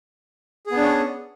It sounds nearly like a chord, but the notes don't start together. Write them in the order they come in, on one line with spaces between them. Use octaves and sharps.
G#4 B3 D4 C#4